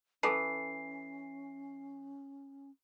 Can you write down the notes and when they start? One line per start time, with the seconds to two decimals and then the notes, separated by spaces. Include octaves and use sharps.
0.23 E3 C#4 A4 A5 C7